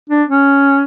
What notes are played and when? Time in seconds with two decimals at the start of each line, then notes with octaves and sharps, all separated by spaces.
0.10 D4
0.29 C#4